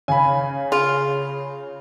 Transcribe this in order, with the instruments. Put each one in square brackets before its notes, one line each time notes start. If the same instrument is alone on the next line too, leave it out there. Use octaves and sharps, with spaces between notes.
[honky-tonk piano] C#3 [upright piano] G#5 B5
[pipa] F4 [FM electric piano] G#4